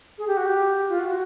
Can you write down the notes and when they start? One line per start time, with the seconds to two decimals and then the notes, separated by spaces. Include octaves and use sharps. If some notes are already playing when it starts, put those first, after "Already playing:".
0.18 G#4
0.27 G4
0.37 F#4
0.46 G4
0.89 F4
0.99 F#4